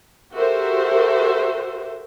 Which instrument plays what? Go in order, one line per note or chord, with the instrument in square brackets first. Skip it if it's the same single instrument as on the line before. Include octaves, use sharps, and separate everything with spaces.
[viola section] F#4 G4 A4 A#4 C5 E5